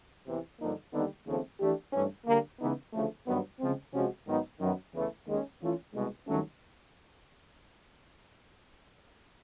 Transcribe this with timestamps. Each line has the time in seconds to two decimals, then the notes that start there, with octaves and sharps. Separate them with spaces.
0.25 E2 C3 E3
0.60 G2 D3 F3 A#3 D#4
0.92 D#2 D3 G3 B3 D#4
1.26 D#2 C#3 F3 A3 C4
1.60 E3 A3 D4 G4
1.93 G2 E3 A3 C#4
2.26 D3 G3 A#3
2.59 C#3 E3 G#3 B3 D#4
2.93 D2 C#3 F3 A3
3.26 G2 D#3 F#3 B3
3.59 C#3 F3 G#3 C4
3.93 C3 F3 G#3 C#4 F#4
4.26 G#2 D#3 F#3 B3 D#4
4.60 F#2 D#3 F#3 B3
4.93 E2 C#3 E3 A3
5.27 D#2 D#3 G#3 C#4
5.61 E3 A3 C#4 F4
5.93 C2 B2 G#3
6.26 G2 D#3 F#3 A3 C#4